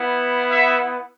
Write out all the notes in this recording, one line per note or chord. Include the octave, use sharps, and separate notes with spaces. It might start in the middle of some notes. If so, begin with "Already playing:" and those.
Already playing: B3 E4
E5